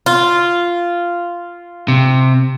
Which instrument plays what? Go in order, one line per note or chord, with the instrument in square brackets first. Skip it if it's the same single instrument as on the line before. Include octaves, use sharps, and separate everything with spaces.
[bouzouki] F4
[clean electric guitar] C3